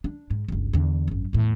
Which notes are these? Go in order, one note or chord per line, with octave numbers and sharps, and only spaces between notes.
D4
G#2
G1 C#2
E2 D3
G#1 F#2
E2 A2